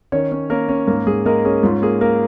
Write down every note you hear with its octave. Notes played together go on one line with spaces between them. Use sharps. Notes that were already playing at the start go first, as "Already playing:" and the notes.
D#3 C#4 C#5
C#4
A#3 C#4 A#4
C#4
G#2 A#3 A#4
G#2 G#4
G#3 A#3 A#4
C#4 G#4
G#2 F4
A#3 G#4
A#3 A#4